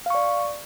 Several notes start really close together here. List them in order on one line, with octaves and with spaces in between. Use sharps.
F5 C#6 D5